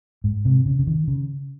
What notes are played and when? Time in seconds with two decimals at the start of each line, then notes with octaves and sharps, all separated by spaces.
0.24 G#2
0.45 C3
0.66 C#3
0.79 C#3
0.87 D#3
1.08 C#3